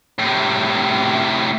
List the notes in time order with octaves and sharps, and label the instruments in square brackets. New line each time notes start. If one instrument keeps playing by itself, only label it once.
[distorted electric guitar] A2 C3